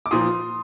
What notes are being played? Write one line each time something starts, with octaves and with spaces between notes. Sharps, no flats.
D6
A#2 F3 C6 D#6